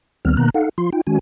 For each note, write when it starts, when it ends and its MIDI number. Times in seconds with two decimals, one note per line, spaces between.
0.25 0.36 38
0.25 0.36 51
0.25 0.36 55
0.25 0.36 59
0.25 0.36 60
0.25 0.36 89
0.37 0.50 47
0.37 0.50 51
0.37 0.50 58
0.37 0.50 59
0.37 0.50 82
0.37 0.50 90
0.54 0.69 63
0.54 0.69 69
0.54 0.69 77
0.54 0.69 78
0.78 0.90 53
0.78 0.90 65
0.78 0.90 84
0.93 1.01 63
0.93 1.01 65
0.93 1.01 79
1.07 1.19 51
1.07 1.19 56
1.07 1.19 61
1.07 1.19 66
1.07 1.19 80